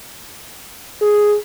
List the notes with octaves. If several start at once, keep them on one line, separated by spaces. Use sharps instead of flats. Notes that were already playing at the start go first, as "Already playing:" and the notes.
G#4